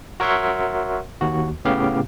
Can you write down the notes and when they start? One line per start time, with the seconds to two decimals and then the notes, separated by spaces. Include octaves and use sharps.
0.20 F#4 A#4 C#5 E5 F#5 C6
1.21 D#2 F#4
1.65 A2 C#3 B3 G4 F5